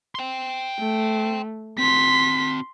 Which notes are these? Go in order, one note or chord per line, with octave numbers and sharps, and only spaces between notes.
G5 C6
A3
C4 F#4 C6 B6